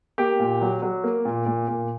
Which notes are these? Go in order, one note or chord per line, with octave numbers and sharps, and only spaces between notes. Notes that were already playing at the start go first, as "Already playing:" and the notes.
A#3 G4
A#2
F#3
F#3
A#3
A#2
A#2
A#2